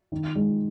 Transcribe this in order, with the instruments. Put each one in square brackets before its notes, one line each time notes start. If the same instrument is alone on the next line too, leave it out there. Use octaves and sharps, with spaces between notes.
[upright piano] D#3
G#3